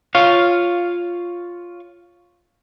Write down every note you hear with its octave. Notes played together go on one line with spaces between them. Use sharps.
F4 C#5 F5